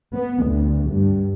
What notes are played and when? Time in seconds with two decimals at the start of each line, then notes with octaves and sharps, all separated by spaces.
0.13 B3
0.44 D2
0.91 G2